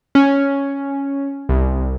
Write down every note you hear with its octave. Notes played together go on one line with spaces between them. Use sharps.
C#4
C2